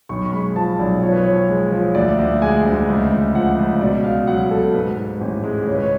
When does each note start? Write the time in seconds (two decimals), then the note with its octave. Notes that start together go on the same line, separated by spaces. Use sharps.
0.09 B1 C#6
0.26 C#6
0.32 G#3 B5
0.56 F3 A5
0.79 B1 D5
1.02 F3 C#5
1.12 B4
1.23 F3 C#5
1.49 G#3
1.72 F3
1.95 D2 D5
2.18 D2
2.42 G#3 G#5
2.65 D2
2.88 C#2
3.12 C#2
3.35 F3 F#5
3.59 C#2
3.81 B2 D5
4.04 B2 F5
4.27 F#3 F#5
4.51 B2 A4
4.74 G#2 B4
4.97 G#2
5.21 A1
5.44 G#3
5.67 C#2 C#5
5.75 B4
5.83 C#5